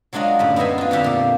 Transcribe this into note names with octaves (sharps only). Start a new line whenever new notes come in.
F#3 G#3 D4 F4 D#5
F#2 A2 D3 G3
B3 D#4 C5 D#5 E5 G#5
D4 F4
F2 D3 G4 E5 A#5
A#2 A#3